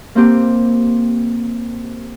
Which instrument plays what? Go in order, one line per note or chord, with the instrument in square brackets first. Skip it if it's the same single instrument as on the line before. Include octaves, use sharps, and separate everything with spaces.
[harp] A#3 C4 G4